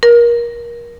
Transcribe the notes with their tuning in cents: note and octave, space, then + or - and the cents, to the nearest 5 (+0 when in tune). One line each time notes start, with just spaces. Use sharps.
A#4 +25